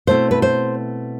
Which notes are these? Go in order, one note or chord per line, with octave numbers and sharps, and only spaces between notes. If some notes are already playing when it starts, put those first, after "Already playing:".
B2 A3 C4 E4 C5
B4
C5